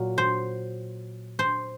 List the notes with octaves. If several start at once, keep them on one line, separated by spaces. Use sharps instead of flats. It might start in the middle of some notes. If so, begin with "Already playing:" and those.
Already playing: A#2 F#3
C5
C5